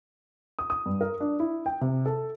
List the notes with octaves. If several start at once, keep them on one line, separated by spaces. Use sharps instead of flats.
D#6
D#6
G2
A#4
D4
E4
G5
C3
A4